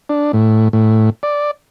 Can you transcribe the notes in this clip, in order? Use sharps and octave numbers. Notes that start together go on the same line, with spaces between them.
D4
A2
A2
D5